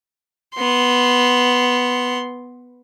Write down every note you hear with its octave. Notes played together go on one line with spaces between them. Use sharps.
B3 C6